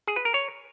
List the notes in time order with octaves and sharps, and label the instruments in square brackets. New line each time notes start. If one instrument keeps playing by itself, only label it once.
[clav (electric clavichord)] G#4
B4
A#4
C#5